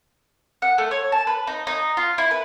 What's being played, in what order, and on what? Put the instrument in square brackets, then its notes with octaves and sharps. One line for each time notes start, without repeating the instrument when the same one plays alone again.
[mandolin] F#5
A3
C#5
A5
B4
D#4
D#4
F4
E4
B4